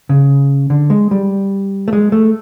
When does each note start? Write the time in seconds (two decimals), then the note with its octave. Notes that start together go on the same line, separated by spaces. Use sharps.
0.09 C#3
0.70 D3
0.90 G#3
1.11 G3
1.88 A3
1.93 G#3
2.12 A3